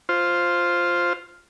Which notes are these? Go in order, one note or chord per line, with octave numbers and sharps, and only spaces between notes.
F4 C5